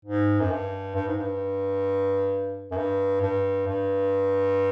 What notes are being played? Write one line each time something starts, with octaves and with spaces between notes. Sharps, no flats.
G#2
F#2
G2
G2
G#2
G2
F#2
G2
G2
G2